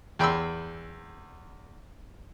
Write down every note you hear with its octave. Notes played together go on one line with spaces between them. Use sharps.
E2 G5 B5 C6 E6